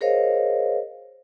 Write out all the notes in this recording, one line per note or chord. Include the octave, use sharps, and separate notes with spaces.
G#4 A#4 C5 C#5 D#5 F5